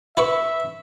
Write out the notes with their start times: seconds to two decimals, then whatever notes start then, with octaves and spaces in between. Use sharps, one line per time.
0.17 E4 B4 E5 C#6